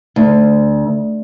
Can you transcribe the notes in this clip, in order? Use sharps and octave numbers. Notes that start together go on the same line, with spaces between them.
D2